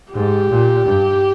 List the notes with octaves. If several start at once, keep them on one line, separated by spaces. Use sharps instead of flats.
G#2 G4
A#2
G2